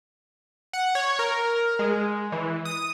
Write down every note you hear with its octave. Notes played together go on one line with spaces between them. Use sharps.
F#5
C#5
A#4
G#3
E3
D#6